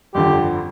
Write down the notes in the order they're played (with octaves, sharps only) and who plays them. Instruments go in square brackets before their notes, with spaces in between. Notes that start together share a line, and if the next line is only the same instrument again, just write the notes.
[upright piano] G1 F2 D3 F3 [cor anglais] G4